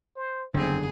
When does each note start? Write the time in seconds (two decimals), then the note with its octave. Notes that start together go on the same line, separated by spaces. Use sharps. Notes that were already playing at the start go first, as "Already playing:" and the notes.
0.16 C5
0.54 F#1 E2 G2 D3 B3 C4 G#4